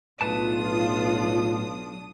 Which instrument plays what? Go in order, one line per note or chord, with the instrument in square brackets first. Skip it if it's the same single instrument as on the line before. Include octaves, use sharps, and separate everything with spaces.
[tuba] B1 [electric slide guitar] A2 B4 A5 [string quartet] F#3 D4 D#6 [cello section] F4